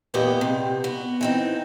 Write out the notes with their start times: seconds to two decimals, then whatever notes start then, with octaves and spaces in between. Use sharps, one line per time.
0.14 E2 G2 A#2 B3 G4 D#5
0.41 C3
0.84 B3 F#4
1.21 E3 C4 D#4